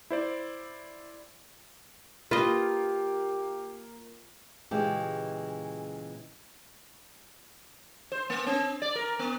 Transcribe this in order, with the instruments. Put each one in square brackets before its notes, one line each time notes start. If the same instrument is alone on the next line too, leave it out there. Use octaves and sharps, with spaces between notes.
[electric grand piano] E4 C5 D5
[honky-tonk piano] A#3 [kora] F4 [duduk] G4 [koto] B4 D#5
[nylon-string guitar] A#2 C#3 E3 G#3 G4
[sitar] C5
A#3
C4
D5
A#4
B3